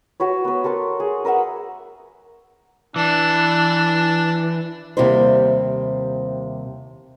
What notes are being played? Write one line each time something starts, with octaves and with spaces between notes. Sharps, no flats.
F#4 B4 C#5
B3 B4
A4 A#4 C6 D6
G#4
A#4 B4 E5 F#5
E3 D4
D#2 C3 G3 C4 E4 C5